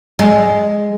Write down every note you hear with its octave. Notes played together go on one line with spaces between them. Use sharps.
G#3